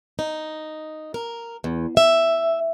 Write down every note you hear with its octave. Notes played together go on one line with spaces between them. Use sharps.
D#4
A#4
E2
E5